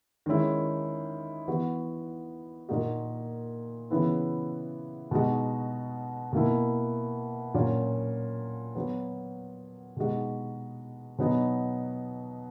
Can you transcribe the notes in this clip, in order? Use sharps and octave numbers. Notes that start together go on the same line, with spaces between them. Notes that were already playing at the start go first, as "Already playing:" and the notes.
D#3 G#3 C#4 E4
E3 B3 F#4
A#2 A#3 D#4 F#4
C#3 E3 B3 E4
B2 G#3 D#4 F#4
B2 A#3 E4
A#2 F#3 C#4 F#4
F#3 B3 F#4
B2 G#3 D#4 F#4
B2 F#3 B3 D#4